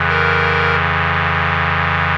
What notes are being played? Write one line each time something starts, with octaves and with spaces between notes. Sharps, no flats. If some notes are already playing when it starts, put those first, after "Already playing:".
Already playing: F2 C#3 E3
A#4